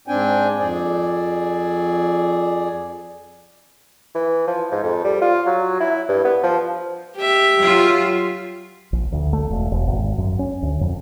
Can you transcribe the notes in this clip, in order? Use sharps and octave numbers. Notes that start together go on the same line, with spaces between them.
G#2 C4 D4 G5 G#5
F2 G#4 D5
E3
F3
G#2
F2
G3
F4
F#3
E4
G2
B3
F3
G4 E5
F#3 F4
A#1
D2
A3
E1
E1
G#1
F#2
C#4
D2
F2